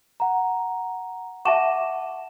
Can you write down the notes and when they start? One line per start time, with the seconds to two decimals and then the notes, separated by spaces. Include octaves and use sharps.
0.20 F#5 A#5
1.45 E5 F#5 A5 C#6 D6 E7